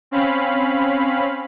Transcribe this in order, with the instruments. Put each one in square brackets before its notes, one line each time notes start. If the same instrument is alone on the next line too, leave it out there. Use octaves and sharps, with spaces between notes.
[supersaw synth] C4 C#4 F5 B5